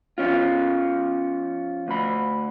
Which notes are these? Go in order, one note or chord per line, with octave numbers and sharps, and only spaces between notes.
F3 C#4 F4
D2 B5